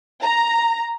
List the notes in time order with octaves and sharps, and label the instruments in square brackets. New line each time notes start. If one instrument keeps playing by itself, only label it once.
[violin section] A#5